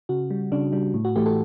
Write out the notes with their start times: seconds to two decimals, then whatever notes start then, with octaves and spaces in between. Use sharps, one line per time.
0.09 C#3 F#4
0.30 G3
0.52 C#3 D4
0.72 G3 D4
0.94 A2
1.05 F#4
1.16 E3 A3 G4
1.26 A4